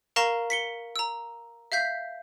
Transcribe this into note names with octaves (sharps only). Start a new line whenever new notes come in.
A#4 F5 A#5 C#6 A#6 E7
B6 C#7 G7
A#5 E6
E5 F5 G6 B6